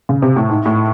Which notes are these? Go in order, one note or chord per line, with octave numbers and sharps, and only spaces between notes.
C#3
C3
A2
G#2
A2